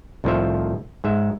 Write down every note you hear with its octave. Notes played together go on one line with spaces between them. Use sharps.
C2 A2 D#3 F3 C5 E5
G#2 G#3 E5